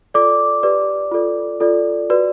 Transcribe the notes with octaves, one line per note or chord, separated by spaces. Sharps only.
F4 A4 D5 D6
G4 B4 D5
F4 A4 D5
F4 A4 D5
F#4 B4 D5